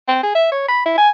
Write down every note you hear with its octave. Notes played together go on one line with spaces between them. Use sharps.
C4
G#4
E5
C#5
B5
E4
G#5